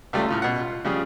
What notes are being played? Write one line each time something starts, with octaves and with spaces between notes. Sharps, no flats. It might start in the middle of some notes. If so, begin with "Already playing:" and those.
C#2 G3 A3 F4
A2 C#3 F4
B2 F#5
F4
C#3 F3 G3 G#4